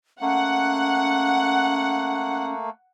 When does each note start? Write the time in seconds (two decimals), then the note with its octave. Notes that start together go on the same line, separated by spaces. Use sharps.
0.21 A3 A#3 C#4 F#5